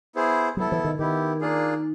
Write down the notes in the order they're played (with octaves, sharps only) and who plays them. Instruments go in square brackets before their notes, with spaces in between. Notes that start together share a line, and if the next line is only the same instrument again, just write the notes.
[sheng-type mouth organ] B3 E4 G#4 C5
[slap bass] F#3 [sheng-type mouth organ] B3 E4 A4
[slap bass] E3
D#3
[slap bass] D#3 [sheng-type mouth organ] B3 E4 G4
[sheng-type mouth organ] A#3 D4 F4 G#4